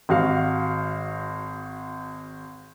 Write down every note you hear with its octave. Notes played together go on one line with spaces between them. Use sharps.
G#1 F#4 F5